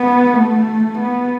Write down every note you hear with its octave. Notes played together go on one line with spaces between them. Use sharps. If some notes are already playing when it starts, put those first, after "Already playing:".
Already playing: B3
A3
B3